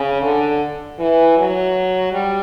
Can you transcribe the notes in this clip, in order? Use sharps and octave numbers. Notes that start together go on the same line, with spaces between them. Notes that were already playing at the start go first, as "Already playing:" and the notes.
Already playing: C#3
D3
E3
F#3
G3